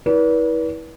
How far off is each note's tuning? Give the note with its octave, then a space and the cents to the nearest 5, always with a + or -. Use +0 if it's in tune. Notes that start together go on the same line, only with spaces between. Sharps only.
E4 -30 B4 -40 D5 -40